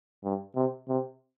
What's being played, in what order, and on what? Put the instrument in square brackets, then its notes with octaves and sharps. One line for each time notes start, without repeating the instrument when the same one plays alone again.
[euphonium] G2
C3
C3